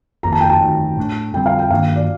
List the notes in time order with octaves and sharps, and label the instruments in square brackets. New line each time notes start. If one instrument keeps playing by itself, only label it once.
[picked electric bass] G1 F2 D#3 A#3 [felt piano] A#5
[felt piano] A5
G5
A5
[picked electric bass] G1 F2 D#3 A3
A2 A3 D4
[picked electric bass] F2 D3 G3 C4 [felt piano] G5
[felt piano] F5
G5
[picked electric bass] G2 D#3 A#3 D4 [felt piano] F5
[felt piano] D5